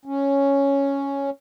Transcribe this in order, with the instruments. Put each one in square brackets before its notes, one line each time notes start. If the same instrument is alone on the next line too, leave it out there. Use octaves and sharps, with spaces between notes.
[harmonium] C#4